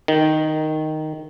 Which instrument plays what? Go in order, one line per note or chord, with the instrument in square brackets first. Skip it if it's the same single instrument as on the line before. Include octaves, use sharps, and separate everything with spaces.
[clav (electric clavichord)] D#3